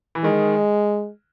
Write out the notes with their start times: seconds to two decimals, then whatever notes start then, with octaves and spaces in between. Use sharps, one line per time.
0.15 E3
0.24 D#3 G#3